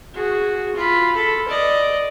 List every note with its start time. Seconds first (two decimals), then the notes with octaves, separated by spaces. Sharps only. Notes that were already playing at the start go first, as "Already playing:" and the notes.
0.14 F#4 G#4
0.75 F4 B5
1.16 A4 B5
1.48 D5 D#5